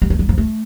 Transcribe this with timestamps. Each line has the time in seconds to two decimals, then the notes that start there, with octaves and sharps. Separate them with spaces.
0.02 G3
0.10 A3
0.19 G3
0.29 F3
0.38 A3